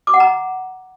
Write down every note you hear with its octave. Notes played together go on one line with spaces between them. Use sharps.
D6
F#5
A#5